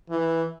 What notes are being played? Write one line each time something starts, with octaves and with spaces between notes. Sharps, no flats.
E3